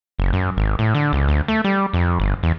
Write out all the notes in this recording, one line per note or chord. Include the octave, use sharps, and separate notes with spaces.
F#1
F#2
G#1
A2
D3
C#2
D2
A3
G3
F2
G1
E2